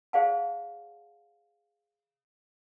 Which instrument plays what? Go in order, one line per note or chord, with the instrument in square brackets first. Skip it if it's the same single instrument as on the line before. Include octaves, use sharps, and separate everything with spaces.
[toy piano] G#4 C5 D5 F5 F#5 A5